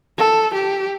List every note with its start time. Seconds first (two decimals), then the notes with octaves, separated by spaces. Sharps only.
0.18 A4
0.54 G4